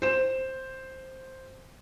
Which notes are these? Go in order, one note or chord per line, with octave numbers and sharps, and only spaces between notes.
C5 E7